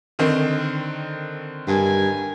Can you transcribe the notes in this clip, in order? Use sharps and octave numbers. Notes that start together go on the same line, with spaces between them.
D3 D#3 C4
G2 A#4 G#5